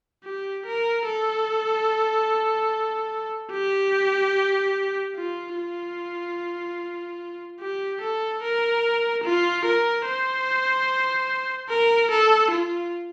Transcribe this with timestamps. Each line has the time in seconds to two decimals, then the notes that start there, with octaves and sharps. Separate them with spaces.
0.24 G4
0.66 A#4
1.06 A4
3.52 G4
5.15 F4
5.56 F4
7.61 G4
8.01 A4
8.43 A#4
9.24 F4
9.65 A#4
10.05 C5
11.69 A#4
12.10 A4
12.51 F4